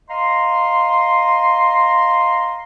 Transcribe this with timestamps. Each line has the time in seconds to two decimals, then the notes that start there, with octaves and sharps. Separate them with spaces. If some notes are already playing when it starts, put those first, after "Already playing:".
0.09 D#5 F5 A#5 C6